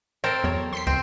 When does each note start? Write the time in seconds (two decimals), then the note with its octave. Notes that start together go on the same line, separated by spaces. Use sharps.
0.24 C4 A4 A#4 C5
0.44 E2 F#3 C#5
0.73 C6 B6 C7
0.87 C#2 C4